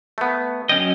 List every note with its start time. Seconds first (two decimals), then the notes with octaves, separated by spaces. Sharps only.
0.18 A3 B3
0.69 F#3 C#4 D#5 G5